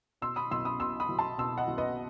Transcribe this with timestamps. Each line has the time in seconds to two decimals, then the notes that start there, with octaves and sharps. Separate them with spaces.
0.22 B2 C6 E6
0.36 B5 D#6
0.51 B1 C6 E6
0.65 B5 D#6
0.80 B2 C6 E6
1.00 B5 D#6
1.09 B1
1.19 A5 C6
1.38 B2 C6 E6
1.58 D#5 F#5
1.68 B1
1.78 B4 D#5